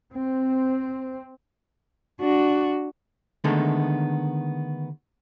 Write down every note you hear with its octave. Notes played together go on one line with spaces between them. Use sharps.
C4
D4 F#4
D3 D#3 G#3 A3 B3